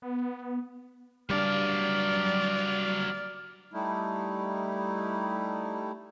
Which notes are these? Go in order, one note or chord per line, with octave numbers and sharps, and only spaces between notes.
B3
F#3 G3 D4 D5 F5 F6
G3 A3 D#4 E4